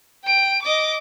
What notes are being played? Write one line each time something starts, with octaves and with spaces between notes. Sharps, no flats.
G5 D7
D#5 D6